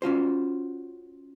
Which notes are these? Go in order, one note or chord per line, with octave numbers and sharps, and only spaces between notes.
C#4 F4 F#4 C5